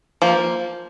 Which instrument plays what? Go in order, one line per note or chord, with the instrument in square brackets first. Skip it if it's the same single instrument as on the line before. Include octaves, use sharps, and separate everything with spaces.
[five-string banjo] F3 A#3